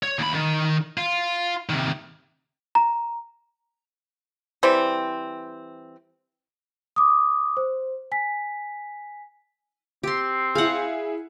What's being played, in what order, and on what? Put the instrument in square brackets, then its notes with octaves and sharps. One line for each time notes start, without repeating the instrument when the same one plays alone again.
[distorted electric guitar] C#5
D#2 B5
D#3
F4
C3 D#3
[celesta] A#5
[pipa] E3 G3 C4
[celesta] D6 D#6
C5
G#5 B6
[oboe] C4 [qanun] G4 C6
[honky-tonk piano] E4 G#4 [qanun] F5 F#5